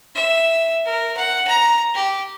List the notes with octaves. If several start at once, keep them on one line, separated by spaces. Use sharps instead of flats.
E5
A#4
F#5
A#5
G4